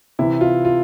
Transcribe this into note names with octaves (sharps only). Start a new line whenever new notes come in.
C3 E3 E4
F4
F4